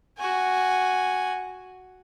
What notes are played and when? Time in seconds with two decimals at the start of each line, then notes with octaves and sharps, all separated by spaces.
0.18 F#4 G#5